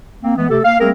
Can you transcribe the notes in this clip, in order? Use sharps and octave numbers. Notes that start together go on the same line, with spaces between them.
A#3 C4
E3 G#3 A3 B3
C3 A3 G4 A4
A#3 F5
G3 A3 A#3 C4 G#4 A#4